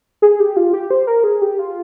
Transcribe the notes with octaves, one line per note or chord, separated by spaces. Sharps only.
G#4
G4
F4
G4
C5
A#4
G#4
G4
F4